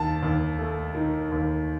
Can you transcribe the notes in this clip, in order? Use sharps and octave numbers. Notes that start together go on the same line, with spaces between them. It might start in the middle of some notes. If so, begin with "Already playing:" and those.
Already playing: D#2 A5
D#2
A3
D#3
D#2